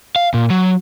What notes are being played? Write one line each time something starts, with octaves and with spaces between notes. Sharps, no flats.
F5
A#2
F#3